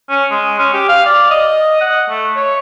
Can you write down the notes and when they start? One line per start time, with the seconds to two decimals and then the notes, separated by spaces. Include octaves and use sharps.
0.09 C#4
0.31 G#3
0.59 C#4
0.74 G4
0.89 F5
1.06 D5
1.30 D#5
1.81 F#5
2.09 A3
2.36 C#5